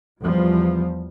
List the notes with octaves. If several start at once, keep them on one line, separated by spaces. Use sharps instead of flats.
E2 F3 G3